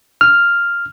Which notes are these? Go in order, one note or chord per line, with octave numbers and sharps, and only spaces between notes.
F6